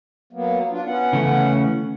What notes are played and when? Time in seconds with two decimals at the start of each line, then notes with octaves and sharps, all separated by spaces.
0.33 F#3 A#3 B3
0.70 D4 F4
0.86 B3 C#4 F#5
1.13 C#3 E3 A3